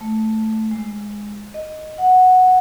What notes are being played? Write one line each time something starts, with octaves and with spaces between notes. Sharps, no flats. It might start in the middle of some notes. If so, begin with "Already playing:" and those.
A3
G#3
D#5
F#5